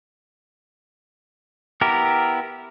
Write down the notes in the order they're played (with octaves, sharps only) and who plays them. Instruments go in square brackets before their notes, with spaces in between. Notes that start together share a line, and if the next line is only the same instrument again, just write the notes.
[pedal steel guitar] B3 E4 G4 A#4